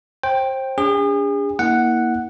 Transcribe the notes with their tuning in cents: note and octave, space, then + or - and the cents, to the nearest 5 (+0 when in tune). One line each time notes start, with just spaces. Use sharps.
C5 +25 G5 +0
D4 -40 G#4 -40
A#3 +15 E4 -35 F#5 +0